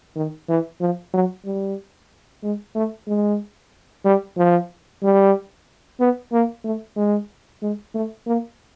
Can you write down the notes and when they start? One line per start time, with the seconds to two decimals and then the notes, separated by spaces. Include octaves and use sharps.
0.16 D#3
0.49 E3
0.80 F3
1.14 F#3
1.45 G3
2.43 G#3
2.75 A3
3.07 G#3
4.05 G3
4.38 F3
5.03 G3
6.00 B3
6.32 A#3
6.64 A3
6.96 G#3
7.62 G#3
7.94 A3
8.26 A#3